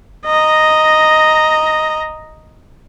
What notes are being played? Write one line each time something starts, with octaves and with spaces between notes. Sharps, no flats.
D#5 A#5